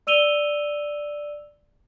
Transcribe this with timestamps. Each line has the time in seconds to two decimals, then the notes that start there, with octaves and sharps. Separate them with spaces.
0.07 D5 E6 D#7 F7 G7